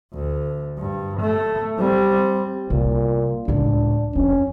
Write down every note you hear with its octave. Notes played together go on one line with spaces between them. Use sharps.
D2
G2
A3
G3 C4
C2 A#2
C#2 A2 D4
F2 F3 C#4